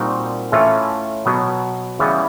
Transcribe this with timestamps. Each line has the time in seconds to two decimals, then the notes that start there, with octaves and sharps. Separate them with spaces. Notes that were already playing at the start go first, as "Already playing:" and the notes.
Already playing: A#2 G3 C4 D#4 F#4
0.52 A2 E3 A3 C#4 F4
1.25 B2 F#3 B3
1.99 C#3 E3 G3 B3